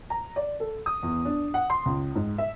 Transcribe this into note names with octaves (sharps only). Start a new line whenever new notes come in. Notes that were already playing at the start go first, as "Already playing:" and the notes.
A#5
D5
A4
D#6
E2
D4
F#5
C6
C#2
G#2
E5